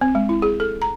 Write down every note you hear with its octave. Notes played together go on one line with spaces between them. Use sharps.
C4
G#3
E4
G#4
A4
A#5